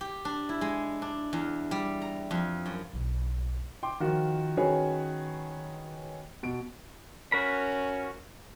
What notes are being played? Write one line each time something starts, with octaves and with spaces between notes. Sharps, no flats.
G4
D4
E4
G#3
D4
E2
G3
A#5
F2
F#2
B1 E2
G5 C6 D6
D#3 F3 F4 F#4
D#3 C#4 F#4 G#4 B4 C#5
B2 D7
C#4 F#4 A#4 B5